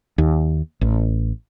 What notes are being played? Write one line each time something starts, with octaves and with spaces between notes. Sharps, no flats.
D#2
A1